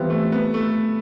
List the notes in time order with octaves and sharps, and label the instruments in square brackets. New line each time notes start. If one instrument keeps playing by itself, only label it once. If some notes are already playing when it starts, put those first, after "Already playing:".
Already playing: [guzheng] E3 G3 C4 F4 [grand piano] B3
[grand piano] A3
B3
A3